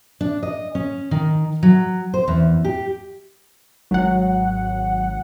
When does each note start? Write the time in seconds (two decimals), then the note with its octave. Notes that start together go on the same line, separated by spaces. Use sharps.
0.21 D4
0.43 D#5
0.75 C#4
1.11 D#3
1.63 F#3
2.14 C5
2.28 E2
2.65 G4
3.91 G#1 F#3 F#5